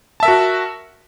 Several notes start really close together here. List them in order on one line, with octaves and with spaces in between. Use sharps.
A5 E5 A#4 F#4